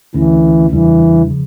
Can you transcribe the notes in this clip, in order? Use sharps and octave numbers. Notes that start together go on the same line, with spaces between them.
D2 D3 E3 A3 C#4
E2 C#3 E3 G3 D4
C#3 F3